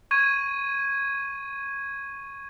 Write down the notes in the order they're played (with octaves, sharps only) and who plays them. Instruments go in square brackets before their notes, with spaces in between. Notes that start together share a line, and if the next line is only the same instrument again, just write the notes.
[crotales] C#6 G#6 D#7